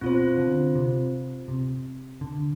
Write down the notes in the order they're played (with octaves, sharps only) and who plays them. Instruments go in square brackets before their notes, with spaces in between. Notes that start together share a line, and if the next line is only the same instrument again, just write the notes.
[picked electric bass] B2 [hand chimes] C4 F4 C5
[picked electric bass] D3
C3
C3
D3